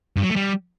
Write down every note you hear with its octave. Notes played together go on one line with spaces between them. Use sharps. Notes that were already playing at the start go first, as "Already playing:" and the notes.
G2
F#3
A3
G3